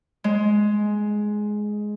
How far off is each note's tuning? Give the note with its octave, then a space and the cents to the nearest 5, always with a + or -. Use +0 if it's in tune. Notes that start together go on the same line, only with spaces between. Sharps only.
G#3 +10